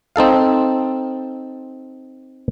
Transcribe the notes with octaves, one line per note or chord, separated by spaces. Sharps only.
C4 D#4 A4 F5